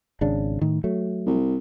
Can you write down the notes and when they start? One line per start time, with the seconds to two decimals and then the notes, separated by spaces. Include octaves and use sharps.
0.21 G#1 C#3 D4
0.61 A2 D#3
0.84 F#3 A3
1.26 C2